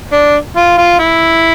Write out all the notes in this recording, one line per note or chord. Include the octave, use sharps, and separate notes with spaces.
D4
F4
F4
E4